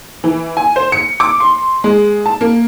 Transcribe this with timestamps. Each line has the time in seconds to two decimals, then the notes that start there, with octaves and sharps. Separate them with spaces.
0.24 E3
0.57 G#5
0.76 C5
0.92 C#7
1.20 D6
1.40 C6
1.84 G#3
2.26 A5
2.41 A#3